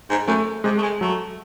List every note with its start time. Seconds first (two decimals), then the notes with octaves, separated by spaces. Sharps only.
0.10 G#2
0.27 F#2 A3
0.64 C3 G#3
0.77 A3
0.82 G#3
1.01 F#3 A3